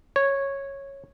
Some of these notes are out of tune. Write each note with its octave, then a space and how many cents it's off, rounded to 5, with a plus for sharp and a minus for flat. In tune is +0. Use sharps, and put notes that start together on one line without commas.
C#5 -10